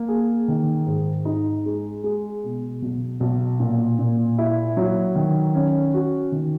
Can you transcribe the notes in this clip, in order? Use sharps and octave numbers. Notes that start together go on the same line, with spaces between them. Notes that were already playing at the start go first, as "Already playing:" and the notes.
Already playing: A#3
G#4
D#3
G#2
D#4
G#3
G#3
B2
B1
B1
A#2
A#2
E4
F#3
D#3
C#4
F#4
D#3